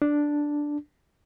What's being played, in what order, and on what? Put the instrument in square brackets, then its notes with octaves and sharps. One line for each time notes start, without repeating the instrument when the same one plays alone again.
[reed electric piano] D4